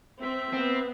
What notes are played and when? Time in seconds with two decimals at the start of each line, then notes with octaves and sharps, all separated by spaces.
0.21 C4 E5
0.53 B3 C4